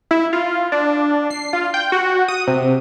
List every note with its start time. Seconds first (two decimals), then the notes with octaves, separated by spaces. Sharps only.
0.11 E4
0.33 F4
0.72 D4
1.30 C7
1.53 F4
1.74 G5
1.92 F#4
2.28 D#6
2.47 C3